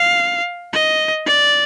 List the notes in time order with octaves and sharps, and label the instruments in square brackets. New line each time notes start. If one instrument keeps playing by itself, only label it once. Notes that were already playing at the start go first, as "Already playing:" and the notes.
Already playing: [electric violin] F5
D#5
D5